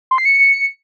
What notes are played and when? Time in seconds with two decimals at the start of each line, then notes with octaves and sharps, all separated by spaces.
0.11 C6
0.18 C7
0.25 C#7